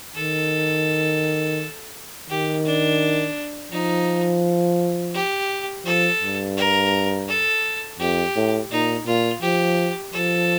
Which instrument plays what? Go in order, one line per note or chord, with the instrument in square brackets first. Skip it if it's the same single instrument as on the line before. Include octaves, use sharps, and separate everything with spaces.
[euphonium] D#3 [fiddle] A4
[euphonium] D#3 [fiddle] G4
[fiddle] D4
[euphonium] F3 [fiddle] D#4
[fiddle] G4
[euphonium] F3 [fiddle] A4
[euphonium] G2
[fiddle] A#4
A4
[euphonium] F2 [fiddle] G4
[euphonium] A2
[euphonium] A#2 [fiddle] D#4
[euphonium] A#2 [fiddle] F4
[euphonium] F3 [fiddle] G4
[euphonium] F3 [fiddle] A4